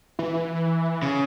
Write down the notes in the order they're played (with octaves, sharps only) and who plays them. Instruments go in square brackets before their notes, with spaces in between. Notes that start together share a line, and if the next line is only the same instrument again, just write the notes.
[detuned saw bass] E3
[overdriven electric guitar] C#3